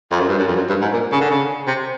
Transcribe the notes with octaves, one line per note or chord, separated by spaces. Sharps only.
F2
F#2
G2
F#2
F2
F#2
G2
G#2
A#2
C#3
D3
C#3
C3